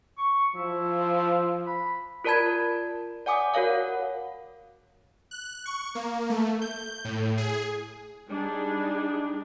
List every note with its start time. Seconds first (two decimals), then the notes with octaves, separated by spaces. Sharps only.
0.18 C#6
0.56 F3 E4
1.67 B5
2.24 F4 A#4 D5 A5 B5 G#6
3.26 D5 F#5 G#5 D6 D#6
3.54 F#4 A#4 C#5 F5 F#5
5.31 F#6
5.66 C#6
5.95 A#3
6.30 A3
6.61 G6
7.05 A2
7.38 G#4
8.28 G3 D4 D#4 G#4